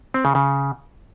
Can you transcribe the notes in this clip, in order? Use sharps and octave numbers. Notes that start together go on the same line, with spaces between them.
C4
C#3
C#3